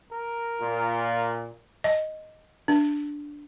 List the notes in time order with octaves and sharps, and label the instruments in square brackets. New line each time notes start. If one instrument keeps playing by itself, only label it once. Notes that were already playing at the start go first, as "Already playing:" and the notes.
[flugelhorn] A#4
[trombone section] A#2 [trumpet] F4
[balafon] D#5
D4